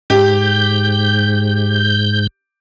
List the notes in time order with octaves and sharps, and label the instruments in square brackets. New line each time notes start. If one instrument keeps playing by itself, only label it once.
[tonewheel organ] G#2 G6 [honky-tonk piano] G4